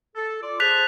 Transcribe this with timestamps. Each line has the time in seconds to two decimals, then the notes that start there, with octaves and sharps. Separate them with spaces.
0.16 A4
0.42 F4 D5
0.60 G#4 C5 A5 F#6 B6 F7